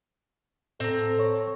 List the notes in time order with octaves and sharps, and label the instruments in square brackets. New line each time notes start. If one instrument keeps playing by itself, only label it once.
[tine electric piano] A2 [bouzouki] C4 A#5 [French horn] A4
[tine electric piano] C#5 C#6